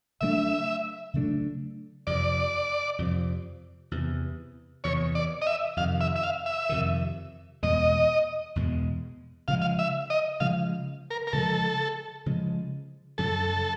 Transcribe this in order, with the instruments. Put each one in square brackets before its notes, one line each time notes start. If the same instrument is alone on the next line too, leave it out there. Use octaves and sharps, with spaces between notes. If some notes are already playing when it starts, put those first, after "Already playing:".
[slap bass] C#3 F#3 A3 D4 [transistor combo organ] E5
[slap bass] C#3 F#3 A3 D4
[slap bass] F2 C3 F3 [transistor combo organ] D5
[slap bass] F2 C3 F3
E2 C3 E3
[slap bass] E2 C3 E3 [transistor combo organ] C#5
[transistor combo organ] D5
D#5
E5
[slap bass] F2 C3 D#3 [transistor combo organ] F5
[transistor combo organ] E5
E5
F5
E5
[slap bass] F2 C3 D#3
[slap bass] E2 B2 G#3 [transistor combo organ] D#5
[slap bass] E2 B2 G#3
[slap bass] C#3 F3 G#3 [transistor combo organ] F5
[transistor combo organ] F5
E5
D#5
[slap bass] C#3 F3 G#3 [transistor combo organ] F5
[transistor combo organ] A#4
A#4
[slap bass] C#3 F3 G#3 [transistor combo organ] A4
[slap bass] C#3 F3 G#3
[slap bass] F#2 C#3 F#3 [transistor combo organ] A4